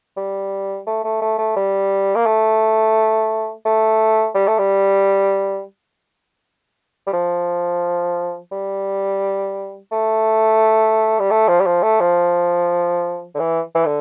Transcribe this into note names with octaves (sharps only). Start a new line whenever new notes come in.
G3
A3
A3
A3
A3
G3
A#3
A3
A3
G3
A3
G3
G3
F3
G3
A3
G3
A3
F3
G3
F3
A3
F3
D3
E3
E3
D3